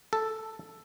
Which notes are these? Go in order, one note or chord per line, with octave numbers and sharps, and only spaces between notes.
A4